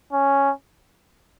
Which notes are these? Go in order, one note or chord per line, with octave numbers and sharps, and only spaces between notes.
C#4